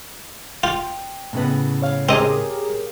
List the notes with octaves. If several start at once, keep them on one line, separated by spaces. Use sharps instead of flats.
F4 G5
A2 C#3 B3
C#5 F5
C4 G4 G#4 A#4 D#5